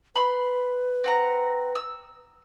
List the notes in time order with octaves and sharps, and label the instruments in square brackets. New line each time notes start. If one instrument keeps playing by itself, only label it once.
[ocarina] B4 [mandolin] B5 C6
[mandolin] C4 F#5 A#5
E6